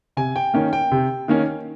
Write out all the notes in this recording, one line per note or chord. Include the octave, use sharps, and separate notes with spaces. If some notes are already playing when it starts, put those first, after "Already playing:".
C3 G#5
G5
D#3 A#3 C#4 G5
G5
C3
D#3 A#3 C#4